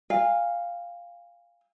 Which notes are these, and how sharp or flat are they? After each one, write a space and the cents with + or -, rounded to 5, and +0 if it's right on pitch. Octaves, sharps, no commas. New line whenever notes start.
F5 +0 G#5 -35